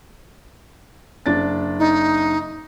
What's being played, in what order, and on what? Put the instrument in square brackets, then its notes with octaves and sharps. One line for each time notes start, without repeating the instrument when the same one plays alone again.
[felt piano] F#1 D4 A6
[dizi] D#4